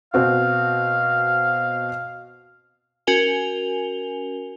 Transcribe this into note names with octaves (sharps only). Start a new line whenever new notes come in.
B2 C4 F#4 F5
C#4 F#4 A#4 G#5 F7 G7